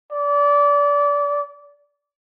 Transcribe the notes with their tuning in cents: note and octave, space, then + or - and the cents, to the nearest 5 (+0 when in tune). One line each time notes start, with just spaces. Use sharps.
D5 -25